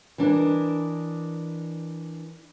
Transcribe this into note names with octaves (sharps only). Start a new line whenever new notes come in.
E3 D4 A#4 D#5